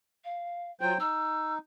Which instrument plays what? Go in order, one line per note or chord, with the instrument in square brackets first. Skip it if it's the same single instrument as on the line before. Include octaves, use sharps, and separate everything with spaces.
[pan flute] F5
[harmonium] F#3 C5 G5 [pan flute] F4
[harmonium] D#4 [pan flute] E6